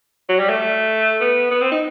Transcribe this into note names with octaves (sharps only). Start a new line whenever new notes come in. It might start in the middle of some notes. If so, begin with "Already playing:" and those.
F#3
G3
A3
B3
B3
C4
D#4